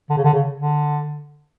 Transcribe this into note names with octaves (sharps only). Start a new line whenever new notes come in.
D3
C#3
D3
C#3
D3